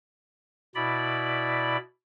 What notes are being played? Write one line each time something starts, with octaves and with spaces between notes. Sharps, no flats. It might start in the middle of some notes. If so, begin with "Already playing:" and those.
B2 E4 D5 B5